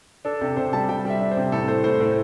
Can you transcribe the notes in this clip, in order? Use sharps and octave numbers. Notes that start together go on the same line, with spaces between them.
D4 A4
C3 A4
C3 C5
G3 A5
G3 G5
G3 E5
D4
C5
C3
A2 A4
A3 C5
A2 C5
A2 C5